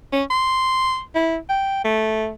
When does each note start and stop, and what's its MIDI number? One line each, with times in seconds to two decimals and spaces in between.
0.12 0.23 61
0.30 1.01 84
1.15 1.37 64
1.49 1.82 79
1.85 2.31 57